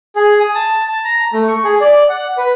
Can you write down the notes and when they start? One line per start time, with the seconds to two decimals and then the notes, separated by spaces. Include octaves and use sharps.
0.16 G#4
0.40 D#6
0.55 A5
0.89 A5
1.04 A#5
1.33 A3
1.48 C#6
1.64 G#4
1.81 D5
2.09 F#5
2.38 B4